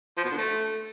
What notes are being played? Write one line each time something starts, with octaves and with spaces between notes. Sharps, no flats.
F3
B2
D3
A3